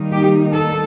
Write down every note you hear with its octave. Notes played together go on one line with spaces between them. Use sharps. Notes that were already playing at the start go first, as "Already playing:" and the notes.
Already playing: D#3 G3 A#3 D#4
G4
A4